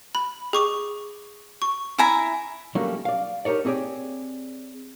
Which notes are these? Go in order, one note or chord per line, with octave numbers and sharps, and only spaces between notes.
B5
G#4 C#6 D6
C#6
E4 G#5 A#5
F#3 G3 A3 A#3 C#4 F#4
D5 F5
D#4 G4 A#4 C#5 D5
C4 G4 G#4 C#5 D5